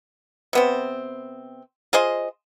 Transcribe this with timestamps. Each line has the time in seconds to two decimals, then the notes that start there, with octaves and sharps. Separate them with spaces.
0.53 C3 B3 C4
1.93 F4 G#4 C5 D#5